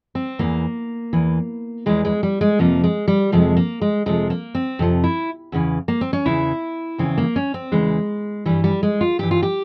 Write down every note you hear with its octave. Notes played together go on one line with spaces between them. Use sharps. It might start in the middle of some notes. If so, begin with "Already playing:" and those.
C4
E2 E3 A#3
E2 E3
E2 E3 G#3
G#3
G3
G#3
F2 C3 F3 A#3
G#3
G3
F2 C3 F3 G#3
A#3
G#3
F2 C3 F3 G#3
A#3
C4
F2 C3 F3
E4
E2 C#3 E3
A#3
C4
C#4
E2 C#3 E3 E4
E2 C#3 E3 C4
A#3
C#4
C4
E2 C#3 E3 G#3
G2 E3 G3
G3
G#3
F4
G2 E3 G4
F4
G4